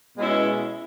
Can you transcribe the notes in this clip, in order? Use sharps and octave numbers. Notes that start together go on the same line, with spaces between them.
B2 G#3 C#4 E4